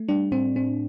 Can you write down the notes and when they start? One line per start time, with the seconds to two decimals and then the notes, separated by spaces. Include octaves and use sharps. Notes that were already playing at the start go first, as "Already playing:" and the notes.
Already playing: A3
0.09 G3 D4
0.32 A2 C4
0.56 A2 C4